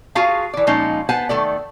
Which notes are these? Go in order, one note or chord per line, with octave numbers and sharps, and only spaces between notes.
F4 F#4 G#4 F5 A5
E3 D5
A#2 F3 G#3 C#4 D#4
B3 C5 F#5 G#5 A5
D#3 A3 A4 D5